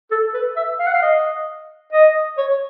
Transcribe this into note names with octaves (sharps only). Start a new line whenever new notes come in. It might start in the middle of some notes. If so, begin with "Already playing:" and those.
A4
B4
E5
F5
F#5
F5
D#5
D#5
C#5